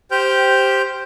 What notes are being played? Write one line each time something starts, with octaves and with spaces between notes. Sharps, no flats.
G4 C5 G5 F6 G6